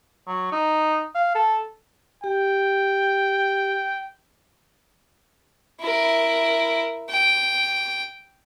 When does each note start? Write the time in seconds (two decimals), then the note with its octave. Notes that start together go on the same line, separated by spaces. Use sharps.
0.27 F#3
0.52 D#4
1.15 F5
1.35 A4
2.24 G4 G5
5.80 E4 A#4
7.10 G5